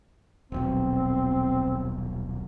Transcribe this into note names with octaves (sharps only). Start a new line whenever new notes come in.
D#1 B1 B2 C4